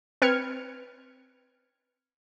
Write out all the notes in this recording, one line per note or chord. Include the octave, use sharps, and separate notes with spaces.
C4 B4 F6 G#6 C#7